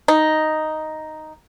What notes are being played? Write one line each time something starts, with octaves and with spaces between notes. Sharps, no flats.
D#4